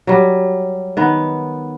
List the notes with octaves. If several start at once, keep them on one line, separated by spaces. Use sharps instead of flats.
F#3 G3
D#3 B3